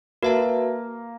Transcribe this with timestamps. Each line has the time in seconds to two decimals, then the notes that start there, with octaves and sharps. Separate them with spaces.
0.22 A#3 F#4 B4 E5 A5